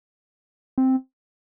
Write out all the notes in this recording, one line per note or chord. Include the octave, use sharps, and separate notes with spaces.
C4